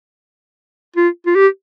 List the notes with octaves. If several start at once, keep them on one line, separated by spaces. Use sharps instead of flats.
F4
F4
G4